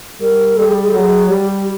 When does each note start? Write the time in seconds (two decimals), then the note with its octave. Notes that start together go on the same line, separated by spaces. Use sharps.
0.20 G3 A#4
0.57 G3 A4
0.69 G#4
0.81 G#4
0.89 A4
0.94 F#3 G#4
1.29 G3 G4